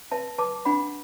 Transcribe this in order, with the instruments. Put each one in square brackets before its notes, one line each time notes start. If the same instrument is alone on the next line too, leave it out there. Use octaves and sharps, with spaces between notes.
[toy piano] B4 E5 A5
B4 A5 D6
D4 F#5 B5